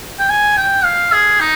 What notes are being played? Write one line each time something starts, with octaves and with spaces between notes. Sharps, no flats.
G5
G#5
G5
F5
G#4
D#4